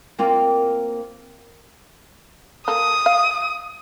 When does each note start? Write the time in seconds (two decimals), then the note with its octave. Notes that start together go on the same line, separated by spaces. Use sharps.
0.19 A#3 C4 F4
2.68 A#3 A4 D#6
3.06 F5